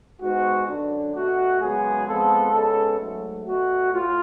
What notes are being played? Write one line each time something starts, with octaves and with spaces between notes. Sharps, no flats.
G#2 G#3 B3 F#4
F#2 D3 F#3 D4
B2 A3 F#4
F#2 C#3 G#3 B3 G#4
F2 F3 G#3 B3 A4
C#3 G#3 B3 A4
G#2 F#3 A3
B2 A3 F#4
A2 F4